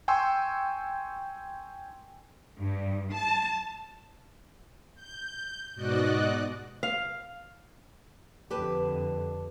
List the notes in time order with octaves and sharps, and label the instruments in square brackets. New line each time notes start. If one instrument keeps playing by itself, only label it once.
[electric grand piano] G5 G#5 C6 C#6 E6
[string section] G2
A5
[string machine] G6
G#2 B2 F#4 D5 D#5 F#6
[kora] F5
[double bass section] F2 D3 [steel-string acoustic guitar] G4 B4 A5